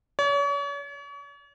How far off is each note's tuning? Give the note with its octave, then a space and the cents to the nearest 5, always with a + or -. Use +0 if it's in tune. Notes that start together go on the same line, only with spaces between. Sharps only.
C#5 +40